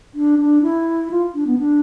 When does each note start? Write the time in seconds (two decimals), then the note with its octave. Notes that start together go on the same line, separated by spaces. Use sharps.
0.15 D4
0.39 D4
0.63 E4
1.11 F4
1.35 D4
1.47 B3
1.58 D4